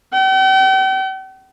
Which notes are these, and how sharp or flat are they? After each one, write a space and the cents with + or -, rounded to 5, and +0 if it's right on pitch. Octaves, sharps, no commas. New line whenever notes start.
G5 -45